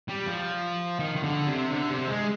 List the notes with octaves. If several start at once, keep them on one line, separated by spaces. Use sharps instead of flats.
G3
F3
D#3
D#3
D3
C3
D3
C3
G#3